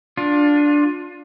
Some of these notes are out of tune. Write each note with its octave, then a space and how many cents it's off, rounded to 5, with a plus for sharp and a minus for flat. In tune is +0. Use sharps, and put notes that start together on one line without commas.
D4 +0 F4 +25